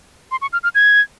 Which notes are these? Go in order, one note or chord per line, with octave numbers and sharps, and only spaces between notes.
C6
C#6
F6
F6
G#6